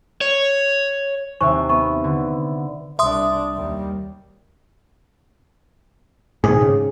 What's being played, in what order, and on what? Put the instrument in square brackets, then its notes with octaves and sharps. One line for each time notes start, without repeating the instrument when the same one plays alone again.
[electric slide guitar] C#5
[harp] D#2 C3 E5 [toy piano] C5 G#5 C#6
[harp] B3 [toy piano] C#6
[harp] D3
[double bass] C2 D4 [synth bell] E5 C6 D#6
[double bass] D#2 G3
[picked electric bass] G#2 B2 D#3 [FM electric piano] G#4
[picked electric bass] G#2 C#3